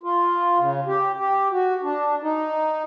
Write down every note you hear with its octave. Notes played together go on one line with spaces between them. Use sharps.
F4
C#3
G4
G4
F#4
D4
D#4